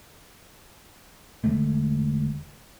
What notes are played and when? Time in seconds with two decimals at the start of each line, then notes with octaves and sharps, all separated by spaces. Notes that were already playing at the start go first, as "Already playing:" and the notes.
1.44 E1 D3 G#3 A3